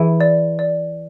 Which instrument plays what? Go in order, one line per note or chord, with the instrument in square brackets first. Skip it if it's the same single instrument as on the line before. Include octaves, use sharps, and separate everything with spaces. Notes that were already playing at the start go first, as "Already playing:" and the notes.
Already playing: [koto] E3 [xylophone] G#4
[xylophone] D5
D5